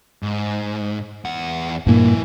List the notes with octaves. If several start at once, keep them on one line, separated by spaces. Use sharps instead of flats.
G#2
E2 F#5
G2 A#2 F3 A#3 E4